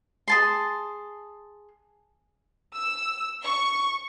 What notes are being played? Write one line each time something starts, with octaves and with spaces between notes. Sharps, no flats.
G#4 A5 C6
E6
C#6